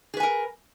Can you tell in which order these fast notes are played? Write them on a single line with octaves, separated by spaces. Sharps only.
G#4 B4 G#5 A#4